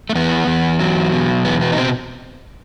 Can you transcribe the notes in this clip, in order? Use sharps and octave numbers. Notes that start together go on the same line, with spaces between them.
A3
E2 B3
E2
F#3
B2
E2 B3
B3
D#4
C4